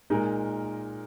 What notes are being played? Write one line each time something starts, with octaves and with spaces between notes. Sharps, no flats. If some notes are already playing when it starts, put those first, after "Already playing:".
A#2 G#3 D#4 A#4